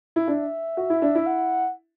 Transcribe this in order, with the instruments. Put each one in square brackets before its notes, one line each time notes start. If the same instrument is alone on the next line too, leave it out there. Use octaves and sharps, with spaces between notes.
[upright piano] E4
[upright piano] D4 [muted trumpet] E5
[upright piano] F#4
E4
D4
E4
[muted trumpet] F#5